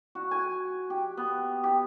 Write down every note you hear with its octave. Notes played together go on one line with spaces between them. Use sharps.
F#4
G#5
G4
B3
G4